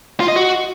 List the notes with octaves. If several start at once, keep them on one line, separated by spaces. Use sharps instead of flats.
F4
D#5
F#4